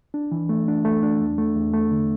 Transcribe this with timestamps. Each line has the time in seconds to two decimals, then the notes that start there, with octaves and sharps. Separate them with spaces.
0.14 D4
0.32 E3
0.49 A3
0.68 D4
0.85 A3
1.03 D4
1.20 E2
1.38 A3
1.55 E2
1.73 A3
1.91 D3